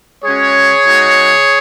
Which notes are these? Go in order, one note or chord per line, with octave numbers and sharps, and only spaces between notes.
G#3 C#4 F#4 G#4 C#5
G#3 D#4 F#4